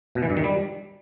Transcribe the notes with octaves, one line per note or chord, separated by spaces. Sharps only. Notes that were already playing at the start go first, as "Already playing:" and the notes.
B2
E3
G2
D#3
G3